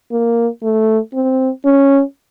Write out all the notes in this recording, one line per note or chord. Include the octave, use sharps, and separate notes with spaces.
A#3
A3
C4
C#4